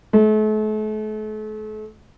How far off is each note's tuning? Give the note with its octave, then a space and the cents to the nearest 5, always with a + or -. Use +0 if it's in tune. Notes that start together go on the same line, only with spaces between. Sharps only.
A3 -40